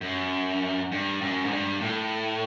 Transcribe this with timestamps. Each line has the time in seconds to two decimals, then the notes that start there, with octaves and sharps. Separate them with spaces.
0.01 F#2
0.92 G2
1.21 F#2
1.45 G#2
1.51 G2
1.81 A2